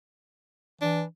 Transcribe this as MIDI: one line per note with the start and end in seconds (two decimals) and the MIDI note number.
0.81 1.04 52
0.81 1.02 62